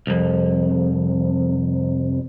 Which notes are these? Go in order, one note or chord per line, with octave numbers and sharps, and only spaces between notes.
C2 F2